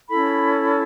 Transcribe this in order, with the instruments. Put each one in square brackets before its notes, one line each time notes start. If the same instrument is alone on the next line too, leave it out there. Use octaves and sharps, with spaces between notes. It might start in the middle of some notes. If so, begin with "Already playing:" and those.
[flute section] C#4 E4 A4 B5